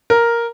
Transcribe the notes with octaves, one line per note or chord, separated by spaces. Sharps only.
A#4